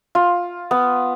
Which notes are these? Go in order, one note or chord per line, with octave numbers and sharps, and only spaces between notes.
F4
B3